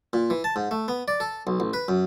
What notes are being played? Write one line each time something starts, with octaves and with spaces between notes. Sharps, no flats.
A#2
E3
A5
G#2
A3
B3
D5
A4
B1
A1
B4
F#2